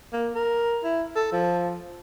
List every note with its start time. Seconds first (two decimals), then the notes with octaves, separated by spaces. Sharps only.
0.13 A#3
0.35 A#4
0.84 E4
1.16 A4
1.32 F3